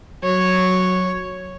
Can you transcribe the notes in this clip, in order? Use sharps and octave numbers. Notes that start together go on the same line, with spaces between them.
F#3 C#5